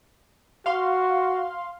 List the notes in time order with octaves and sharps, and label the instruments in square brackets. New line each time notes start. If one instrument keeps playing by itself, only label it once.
[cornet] F#4 [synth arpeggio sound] F5 C6